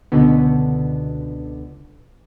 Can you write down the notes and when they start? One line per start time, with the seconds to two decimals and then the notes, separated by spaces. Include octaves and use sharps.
0.12 C#2 B2 D3 B3